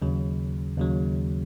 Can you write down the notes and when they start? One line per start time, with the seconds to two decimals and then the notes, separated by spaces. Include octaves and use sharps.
0.02 D#2 C#3 F#3
0.78 D#2 C#3 F#3